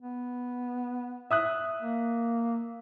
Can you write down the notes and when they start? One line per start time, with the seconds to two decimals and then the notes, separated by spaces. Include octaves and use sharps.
0.01 B3
1.31 E5 D#6 F#6
1.81 A#3